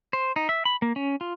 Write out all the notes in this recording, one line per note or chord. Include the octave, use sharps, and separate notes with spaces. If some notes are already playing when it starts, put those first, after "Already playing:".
C5
D#4
E5
B5
A#3
C#4
F4